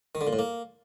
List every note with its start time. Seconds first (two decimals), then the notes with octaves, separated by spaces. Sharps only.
0.15 D#3
0.21 D3
0.27 A#2
0.33 A2
0.39 A#3